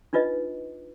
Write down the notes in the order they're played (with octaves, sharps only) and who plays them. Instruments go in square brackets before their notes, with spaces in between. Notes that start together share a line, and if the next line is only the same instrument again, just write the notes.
[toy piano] D4 D#4 F4 B4 D#5